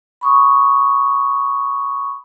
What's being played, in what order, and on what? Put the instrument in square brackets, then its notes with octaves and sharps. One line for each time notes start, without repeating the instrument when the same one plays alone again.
[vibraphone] B5 C#6 D#6